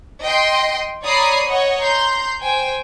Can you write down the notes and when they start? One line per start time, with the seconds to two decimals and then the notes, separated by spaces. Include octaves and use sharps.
0.22 D#5 G5 C6
1.04 C#5 D5 A#5 B5 D#6 C7
1.46 C#5 D#5 F#5
1.81 A#5 C6 G6
2.41 C5 G5 G#5